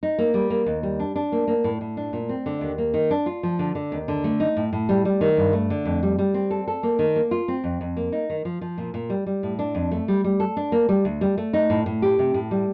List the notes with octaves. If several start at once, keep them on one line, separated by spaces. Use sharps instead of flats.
D#4
A#3
G3
A#3
D#2
G3
D4
D4
A#3
A#3
A2
A2
D4
A#2
C4
D3
D#2
A#3
D#3
D4
F4
F3
D3
D3
D#2
D3
A3
D#4
A2
A2
G3
G3
D#3
G2
A3
D3
F2
G3
G3
C4
A4
A4
A#3
D#3
A#3
F4
C4
F2
F2
A#3
D#4
D#3
F3
F3
A#2
A#2
G3
G3
A2
D4
F2
A3
G3
G3
A4
D4
A#3
G3
D2
G3
A3
D#4
A2
A2
G4
C3
A2
G3